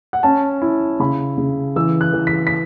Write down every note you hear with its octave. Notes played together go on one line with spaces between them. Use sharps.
F#5
C#4 A5
E4
C#3 B5
C#3
E3 E6
F#6
E3
B6
B6